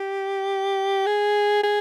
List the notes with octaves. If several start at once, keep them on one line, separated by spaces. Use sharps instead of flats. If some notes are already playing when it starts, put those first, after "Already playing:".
Already playing: G4
G#4
G#4